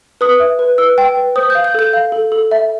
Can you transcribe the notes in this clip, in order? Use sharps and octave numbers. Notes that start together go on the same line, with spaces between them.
B4 D#6
E5
B4
B4 E6
G5
B4
C5 D#6
F5 G6
G6
A4 G6
F5
A4
A4
E5